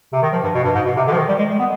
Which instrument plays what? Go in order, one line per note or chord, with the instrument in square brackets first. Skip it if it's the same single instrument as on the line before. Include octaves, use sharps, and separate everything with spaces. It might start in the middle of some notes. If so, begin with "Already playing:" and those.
[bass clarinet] C3
D#3
F3
G2
B2
G2
G#2
B2
C3
D3
F3
D#3
G3
G#3
G#3
B3